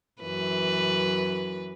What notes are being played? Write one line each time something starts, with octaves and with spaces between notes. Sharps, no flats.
F#2 E3 B4